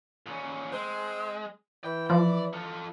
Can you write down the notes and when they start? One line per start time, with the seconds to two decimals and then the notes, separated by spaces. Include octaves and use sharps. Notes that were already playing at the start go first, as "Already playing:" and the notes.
0.26 A#2 C#4
0.73 G#3 C4
1.84 E3 G5
2.10 F3 D5
2.53 F4 A4